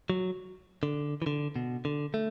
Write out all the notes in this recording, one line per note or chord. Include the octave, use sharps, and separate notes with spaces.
F#3
D3
E3
D3
B2
D3
A3